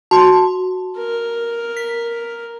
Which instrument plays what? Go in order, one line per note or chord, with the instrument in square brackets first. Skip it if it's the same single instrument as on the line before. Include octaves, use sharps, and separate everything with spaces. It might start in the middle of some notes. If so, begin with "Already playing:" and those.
[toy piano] F#4 [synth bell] A5 C6
[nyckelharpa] A#4
[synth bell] B6